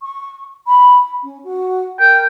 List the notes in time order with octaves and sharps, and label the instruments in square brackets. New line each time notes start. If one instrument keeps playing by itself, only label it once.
[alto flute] C#6
B5
C#4
F#4
[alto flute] A#4 [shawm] G5